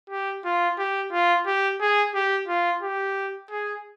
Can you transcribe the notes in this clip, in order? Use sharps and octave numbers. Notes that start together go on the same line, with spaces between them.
G4
F4
G4
F4
G4
G#4
G4
F4
G4
G#4